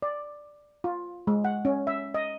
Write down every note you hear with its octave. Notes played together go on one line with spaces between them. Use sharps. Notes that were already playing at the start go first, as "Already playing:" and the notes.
D5
F4
G#3
F#5
C#4
E5
D#5